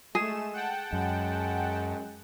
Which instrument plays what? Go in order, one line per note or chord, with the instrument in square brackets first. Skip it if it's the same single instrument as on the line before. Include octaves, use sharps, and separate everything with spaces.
[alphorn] G#3 [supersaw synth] A3 E7 [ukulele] G#4
[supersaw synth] F#5 G5 A5
[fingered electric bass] F#2 [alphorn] G#3